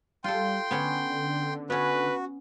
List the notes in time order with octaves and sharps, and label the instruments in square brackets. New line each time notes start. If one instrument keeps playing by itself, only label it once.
[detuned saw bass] G3 [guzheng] F4 A4 [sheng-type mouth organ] G5 C6
[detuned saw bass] D3 [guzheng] B3 C#4 F#5
[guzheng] B3 C#4 [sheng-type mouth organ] F#4 [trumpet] B4